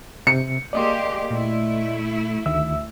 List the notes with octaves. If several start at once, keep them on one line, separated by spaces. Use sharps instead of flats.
C3 C#7
A#3 G4 G#4 D5 D#5 C6
A#2 A3 E4
D2 D#3 E5 E6